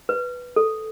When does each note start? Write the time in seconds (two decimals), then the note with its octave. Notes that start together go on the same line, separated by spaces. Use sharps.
0.09 B4
0.56 A4